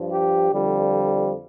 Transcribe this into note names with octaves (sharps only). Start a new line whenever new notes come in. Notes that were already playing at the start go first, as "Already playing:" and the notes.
Already playing: G2 F3
G4
F2 D3 F3 G3